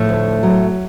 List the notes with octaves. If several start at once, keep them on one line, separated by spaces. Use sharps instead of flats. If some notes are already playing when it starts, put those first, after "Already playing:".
Already playing: A2 F3 A3
D2
F#3